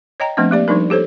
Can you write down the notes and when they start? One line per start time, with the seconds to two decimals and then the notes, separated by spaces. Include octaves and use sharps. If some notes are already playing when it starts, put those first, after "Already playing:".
0.20 C#5 D#5 G5 A#5
0.37 F3 A3 B3 C4 D4 D#5
0.51 A#3 G4 D5
0.68 F3 G3 D4 D#4 A#4
0.90 G4 A4 C5 C#5